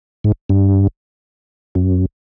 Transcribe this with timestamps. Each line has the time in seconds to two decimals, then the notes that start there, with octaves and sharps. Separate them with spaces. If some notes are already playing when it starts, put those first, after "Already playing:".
0.24 G#2
0.49 G2
1.75 F#2